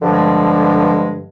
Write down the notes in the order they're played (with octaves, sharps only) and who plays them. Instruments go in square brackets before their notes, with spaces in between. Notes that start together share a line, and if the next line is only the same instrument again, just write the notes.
[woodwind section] G2 D3 F3 G#3